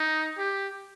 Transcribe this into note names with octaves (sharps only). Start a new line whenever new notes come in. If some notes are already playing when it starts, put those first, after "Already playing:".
Already playing: D#4
G4